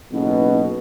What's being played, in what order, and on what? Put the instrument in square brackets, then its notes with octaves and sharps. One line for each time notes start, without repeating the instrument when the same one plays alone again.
[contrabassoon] F#1 [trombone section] B1 E2 B2